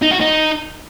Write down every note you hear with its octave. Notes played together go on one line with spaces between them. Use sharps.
D#4
F#4
D#4